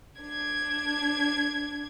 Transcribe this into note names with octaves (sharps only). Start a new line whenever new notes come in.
D4 G#6